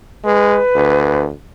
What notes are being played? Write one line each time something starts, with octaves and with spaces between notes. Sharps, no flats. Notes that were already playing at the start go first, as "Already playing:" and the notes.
G#3 B4
D2